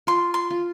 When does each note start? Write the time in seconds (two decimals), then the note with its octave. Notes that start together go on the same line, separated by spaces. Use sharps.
0.07 F4 C6
0.34 C6
0.50 F4